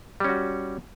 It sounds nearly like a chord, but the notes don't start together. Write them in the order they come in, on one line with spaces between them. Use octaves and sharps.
G3 C#4 F#4